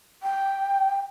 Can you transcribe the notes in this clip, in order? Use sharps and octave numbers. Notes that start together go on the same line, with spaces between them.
G5